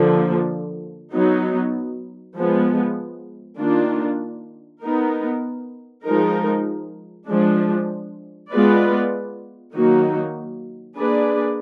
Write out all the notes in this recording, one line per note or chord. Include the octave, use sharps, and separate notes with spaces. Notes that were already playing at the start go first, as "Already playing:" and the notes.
Already playing: D3 F3 A#3
F#3 B3 D#4
F3 G#3 B3
D#3 A#3 D4 F4
B3 D#4 A#4
F3 G#3 D#4 A#4
F3 G#3 D4
G#3 B3 F4 B4 D5
D#3 F#3 A#3 D#4 F#4
A#3 D4 G#4 B4 D5